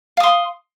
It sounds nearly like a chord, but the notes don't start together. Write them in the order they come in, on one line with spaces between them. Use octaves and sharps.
F5 D#6 C6